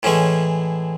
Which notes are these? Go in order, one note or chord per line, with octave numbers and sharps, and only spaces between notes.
A2 E3 G#3 C#4